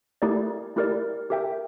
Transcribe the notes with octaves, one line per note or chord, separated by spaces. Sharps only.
A3 E4 G4 A#4 D5
A3 E4 G4 A#4 D5
G4 A#4 E5 G5